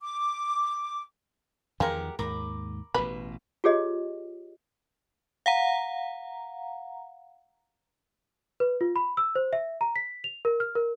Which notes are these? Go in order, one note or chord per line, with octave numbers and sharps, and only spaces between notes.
D6
E2 D#3 F3 G#3 F4 G4 A#4 F#5
D#2 G#2 A#4 B5 D6
A1 B2 G3 B4
F4 G4 G#4 C#5 D#5
F5 F#5 A#5
B4
F4
B5
E6
C5
E5
A#5
B6
F7
A#4
F6
A#4